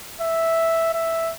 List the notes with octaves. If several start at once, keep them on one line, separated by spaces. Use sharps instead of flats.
E5
E5